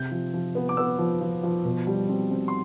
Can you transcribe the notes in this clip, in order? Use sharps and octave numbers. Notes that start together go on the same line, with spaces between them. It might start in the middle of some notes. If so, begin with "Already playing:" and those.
Already playing: C3 G6
F3
F3
B3
D6
B3 E6
F3
F3
F3
B2
G3
C4
C4
C6